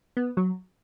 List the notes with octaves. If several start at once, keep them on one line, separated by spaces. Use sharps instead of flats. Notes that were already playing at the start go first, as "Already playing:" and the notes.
B3
F#3